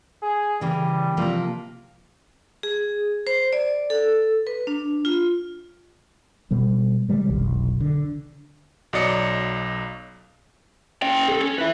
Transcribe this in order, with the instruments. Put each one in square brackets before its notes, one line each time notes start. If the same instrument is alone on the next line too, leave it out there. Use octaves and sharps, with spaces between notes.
[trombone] G#4
[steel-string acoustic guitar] C#3 E3 A#3 [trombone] G3
[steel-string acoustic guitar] C3 F3 A#3
[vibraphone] G#4
C5
D5
A4
B4
D4
F4
[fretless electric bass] B2 G3 B3
C3 D#3 G3 G#3
F1 B1
D3
[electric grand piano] B1 F#3 D5 D#5 C#7
[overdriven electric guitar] C#4 G5
G#4 A4
C#4
E4 B4